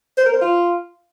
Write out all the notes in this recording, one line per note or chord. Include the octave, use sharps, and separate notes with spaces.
C5
A#4
C5
F4